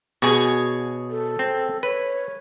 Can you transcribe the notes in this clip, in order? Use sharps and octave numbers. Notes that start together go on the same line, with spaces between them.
B2 F#4 G#4 C#5
A4
C4
B4 C#5